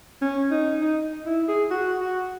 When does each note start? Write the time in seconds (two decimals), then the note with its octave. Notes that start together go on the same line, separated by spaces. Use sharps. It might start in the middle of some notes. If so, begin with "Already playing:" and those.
0.22 C#4
0.51 D#4
0.81 D#4
1.26 E4
1.48 G#4
1.71 F#4
2.00 F#4